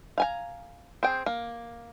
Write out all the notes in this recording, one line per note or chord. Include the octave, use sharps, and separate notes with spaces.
F5 G#5 A#5
C4 G#4 G5
A#3